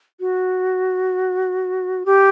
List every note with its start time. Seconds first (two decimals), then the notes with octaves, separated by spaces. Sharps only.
0.20 F#4
2.06 G4